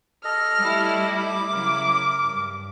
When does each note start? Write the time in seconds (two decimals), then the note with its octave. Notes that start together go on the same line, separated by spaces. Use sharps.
0.25 A4 D#5 F6
0.59 G3 A3 E4
1.10 D6
1.52 C#3 F#3 E4 A#4
2.21 G2